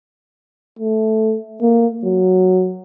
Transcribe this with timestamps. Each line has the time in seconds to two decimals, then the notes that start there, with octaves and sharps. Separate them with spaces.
0.79 A3
1.61 A#3
2.04 F#3